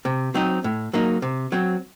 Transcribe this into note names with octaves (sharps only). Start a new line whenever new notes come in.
C3
F#3 C4 D#4
A2
F#3 A#3 D#4
C3
F#3 C4